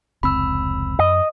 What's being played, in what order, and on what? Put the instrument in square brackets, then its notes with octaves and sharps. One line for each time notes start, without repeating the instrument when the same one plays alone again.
[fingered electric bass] F1 C#2 C4 [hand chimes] B5 E6
[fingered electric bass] F#2 [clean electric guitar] D#5